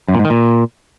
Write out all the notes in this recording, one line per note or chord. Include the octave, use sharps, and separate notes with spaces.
F#2
A#2
G#2
D#3
A#2